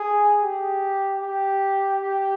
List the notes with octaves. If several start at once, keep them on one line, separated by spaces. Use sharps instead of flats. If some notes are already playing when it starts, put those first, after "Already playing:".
Already playing: G#4
G4
G4
G4